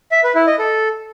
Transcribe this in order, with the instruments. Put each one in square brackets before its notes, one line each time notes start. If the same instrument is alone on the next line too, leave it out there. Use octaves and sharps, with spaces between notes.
[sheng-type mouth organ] E5
B4
E4
D#5
A4